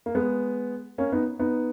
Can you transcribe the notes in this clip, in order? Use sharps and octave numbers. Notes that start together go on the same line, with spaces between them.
A#3
G#3 B3
A#3 C#4
B3 D#4
B3 D#4